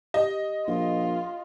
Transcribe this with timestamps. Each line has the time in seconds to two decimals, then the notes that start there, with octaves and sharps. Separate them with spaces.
0.14 G4 D#5
0.67 A#1 F4